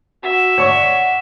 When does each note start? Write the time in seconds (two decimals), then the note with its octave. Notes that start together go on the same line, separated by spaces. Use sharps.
0.23 F#4 E5
0.58 C#5 D5 F#5 C#6